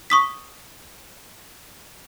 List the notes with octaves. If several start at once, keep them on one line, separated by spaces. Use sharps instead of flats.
C#6 D#6 B6